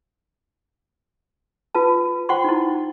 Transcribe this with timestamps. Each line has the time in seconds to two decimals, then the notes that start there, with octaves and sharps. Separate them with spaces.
1.75 F4 B4 A5
2.29 F4 C5 F#5 G5 C6 C#6
2.44 D#4 E4